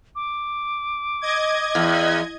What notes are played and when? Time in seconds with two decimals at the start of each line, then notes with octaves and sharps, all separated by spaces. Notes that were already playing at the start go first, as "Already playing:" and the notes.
0.15 D6
1.21 D#5 G#6
1.75 E2